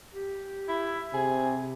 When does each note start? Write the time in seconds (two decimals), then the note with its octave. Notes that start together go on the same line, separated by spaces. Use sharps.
0.13 G4
0.68 E4
1.14 C3 G#4